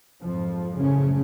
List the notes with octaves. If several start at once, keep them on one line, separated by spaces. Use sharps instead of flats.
G#1 F2 F3
F#2 A2 C#3 A3 C#4